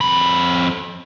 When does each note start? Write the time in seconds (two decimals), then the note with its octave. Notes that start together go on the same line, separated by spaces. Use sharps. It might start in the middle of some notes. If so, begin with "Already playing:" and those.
0.01 F2 B5